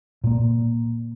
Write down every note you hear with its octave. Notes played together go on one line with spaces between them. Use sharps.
A#2 A#3